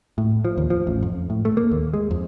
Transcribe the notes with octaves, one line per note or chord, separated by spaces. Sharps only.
A2
F3
D#2
F3
A1
F2
A2
A3
A#3
D#2
G#3
F2